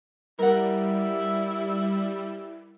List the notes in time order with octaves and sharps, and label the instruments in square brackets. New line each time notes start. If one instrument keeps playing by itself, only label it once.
[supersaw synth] G3 [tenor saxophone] E4 [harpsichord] A#4 F#5